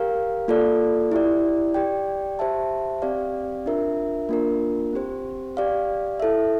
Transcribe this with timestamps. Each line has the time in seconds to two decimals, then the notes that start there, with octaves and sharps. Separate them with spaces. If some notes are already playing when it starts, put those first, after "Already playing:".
Already playing: G4 A#4 F5
0.48 A#3 F4 A4 D5
1.12 E4 G4 D5
1.74 G4 D5 G5
2.39 G4 C5 E5 A5
3.02 C4 G4 D5 F5
3.66 D4 F4 A#4 E5
4.29 A#3 D4 F4 A#4
4.93 C4 G4 C5
5.57 G4 D5 F5
6.20 E4 A4 E5